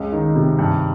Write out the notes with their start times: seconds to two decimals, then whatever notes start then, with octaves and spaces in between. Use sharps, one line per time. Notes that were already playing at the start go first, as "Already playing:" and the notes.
Already playing: C#2
0.12 D#3
0.35 C3
0.58 G2